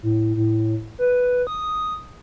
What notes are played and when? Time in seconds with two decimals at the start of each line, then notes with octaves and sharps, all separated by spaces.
0.03 A2
0.36 A2
0.99 B4
1.47 D#6